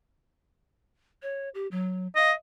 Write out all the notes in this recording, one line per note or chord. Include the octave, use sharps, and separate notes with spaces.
C#5
G4
F#3
D#5 F5